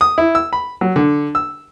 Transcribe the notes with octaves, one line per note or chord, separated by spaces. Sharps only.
D#6
E4
E6
B5
F#3
D3
E6